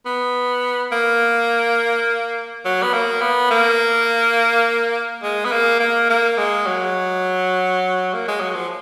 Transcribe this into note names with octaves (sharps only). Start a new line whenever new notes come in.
B3
A#3
F#3
B3
A#3
B3
A#3
G#3
B3
A#3
A#3
A#3
G#3
F#3
A#3
G#3
F#3
F3